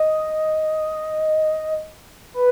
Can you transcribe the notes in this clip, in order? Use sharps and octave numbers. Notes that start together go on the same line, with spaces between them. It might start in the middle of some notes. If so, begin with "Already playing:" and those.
Already playing: D#5
B4